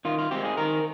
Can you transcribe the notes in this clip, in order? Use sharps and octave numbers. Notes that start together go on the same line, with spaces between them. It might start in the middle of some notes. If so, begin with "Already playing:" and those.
D#3 F4
F4
G#3 C4 G4
G#4
D#3 A#4